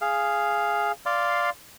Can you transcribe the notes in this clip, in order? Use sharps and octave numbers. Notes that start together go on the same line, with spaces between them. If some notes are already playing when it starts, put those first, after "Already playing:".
G#4 F5
D5 F5 C6